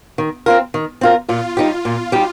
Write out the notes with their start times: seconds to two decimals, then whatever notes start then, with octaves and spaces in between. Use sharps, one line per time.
0.18 D#3
0.46 C4 F4 A#4
0.74 D#3
1.01 C4 F4 A#4
1.29 A#2 F4
1.57 G3 D#4 G4
1.85 A#2
2.12 G3 D#4 G4